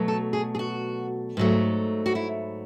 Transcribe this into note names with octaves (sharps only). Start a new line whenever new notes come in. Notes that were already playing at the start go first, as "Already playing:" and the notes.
Already playing: B2 F#3 A3
A4
G#4
G#4
F#4
G#2 F#3 A3
F#4
E4